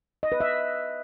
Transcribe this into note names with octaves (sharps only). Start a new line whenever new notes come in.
D#5
B4
E5